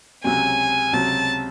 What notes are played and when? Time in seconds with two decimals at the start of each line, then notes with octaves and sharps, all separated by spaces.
0.24 C#2 C3 F#3 C4 G#5
0.93 C#2 C3 F#3 C4 A5